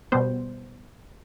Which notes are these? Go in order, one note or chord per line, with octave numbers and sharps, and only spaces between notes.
B2 G3 B3 C5